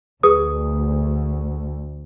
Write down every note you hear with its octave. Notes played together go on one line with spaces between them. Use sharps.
D2 G#4 B4 D#6